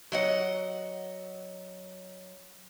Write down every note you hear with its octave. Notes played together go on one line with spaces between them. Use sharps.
F#3 D#5 F#5